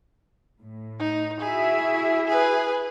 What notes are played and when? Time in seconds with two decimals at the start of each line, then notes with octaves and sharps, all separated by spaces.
0.61 A2
0.99 D#4
1.41 E4 F#4 G#4 E5
2.27 G#4 B4